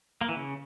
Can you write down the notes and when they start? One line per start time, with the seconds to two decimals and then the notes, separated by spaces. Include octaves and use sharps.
0.21 A#3
0.29 E3
0.36 C#3